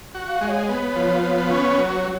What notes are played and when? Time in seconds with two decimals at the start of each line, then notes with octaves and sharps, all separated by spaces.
0.15 F#4
0.28 F5
0.41 G#3
0.48 C#5
0.69 B3
0.96 F3
1.23 B3
1.51 C#4
1.78 F#3